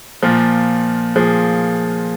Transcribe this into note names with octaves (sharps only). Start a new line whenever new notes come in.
A#2 F3 F4
A#2 F3 G#4